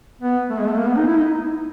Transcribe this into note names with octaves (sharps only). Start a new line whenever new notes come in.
B3
A3
G#3
A3
A#3
B3
D#4
E4
D#4